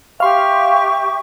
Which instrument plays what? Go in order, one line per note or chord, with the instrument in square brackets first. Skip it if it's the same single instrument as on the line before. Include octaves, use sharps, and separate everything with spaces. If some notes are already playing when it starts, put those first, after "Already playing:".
[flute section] G4 E5 C#6 [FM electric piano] F5 C6